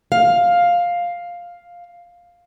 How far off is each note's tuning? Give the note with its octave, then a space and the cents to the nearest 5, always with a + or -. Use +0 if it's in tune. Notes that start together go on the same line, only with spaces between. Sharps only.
F5 +5